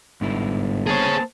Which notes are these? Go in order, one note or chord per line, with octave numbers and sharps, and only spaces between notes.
G1 G#2 E4
A#3 B3 G#4 C5 C#5 A5